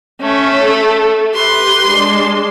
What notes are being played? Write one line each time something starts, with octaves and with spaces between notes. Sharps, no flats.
A3 C#4
A4
G4 B4 C6
G#3 D4